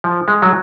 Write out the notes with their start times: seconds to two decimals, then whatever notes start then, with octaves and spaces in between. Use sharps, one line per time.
0.04 F3
0.28 G#3
0.42 F#3